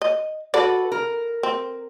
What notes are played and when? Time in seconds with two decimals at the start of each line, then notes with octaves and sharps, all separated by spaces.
0.02 D#5
0.54 F#4 A4 B4 D5
0.92 A#4
1.43 C4